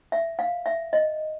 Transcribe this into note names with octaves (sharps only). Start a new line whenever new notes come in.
E5
F5
E5
D#5